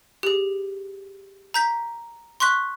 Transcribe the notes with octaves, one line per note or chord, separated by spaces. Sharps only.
G4 G#4
A#5 G6 B6
C6 C#6 F#6 B6